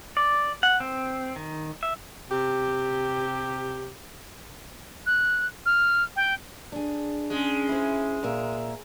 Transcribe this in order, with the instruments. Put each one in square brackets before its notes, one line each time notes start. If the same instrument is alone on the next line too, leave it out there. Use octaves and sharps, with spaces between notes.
[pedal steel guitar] D5
F#5
C4
D#3
E5
[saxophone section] C3 G4
[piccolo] F#6
F6
G5
[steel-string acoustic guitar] D4 G#4
[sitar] G#3 [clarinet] C#4
[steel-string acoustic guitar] E4 C5
A#2 A#4 E5